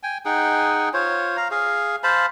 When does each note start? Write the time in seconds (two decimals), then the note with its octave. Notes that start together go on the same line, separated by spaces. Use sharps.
0.03 G5 G#5
0.25 D#4 G#4 F#5 G5
0.93 F4 C5 C#5
1.37 F5 A#5
1.51 G#4 F5
2.04 C5 F5 A5 B5